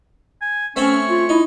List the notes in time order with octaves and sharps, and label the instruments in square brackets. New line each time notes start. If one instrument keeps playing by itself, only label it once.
[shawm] G#5
[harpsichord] A3 C4 [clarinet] C#4 [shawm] C#5
[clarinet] F4
[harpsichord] D#4 [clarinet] E4